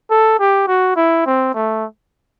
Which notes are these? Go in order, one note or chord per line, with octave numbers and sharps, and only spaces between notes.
A4
G4
F#4
E4
C4
A3